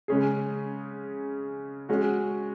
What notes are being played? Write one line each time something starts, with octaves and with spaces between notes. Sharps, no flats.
C#3 G#3 C#4 G#4
G#3 C#4 F#4